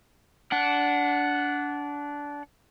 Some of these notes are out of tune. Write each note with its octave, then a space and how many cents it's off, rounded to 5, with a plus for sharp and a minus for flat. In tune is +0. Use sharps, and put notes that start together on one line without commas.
D4 -20 F#5 +0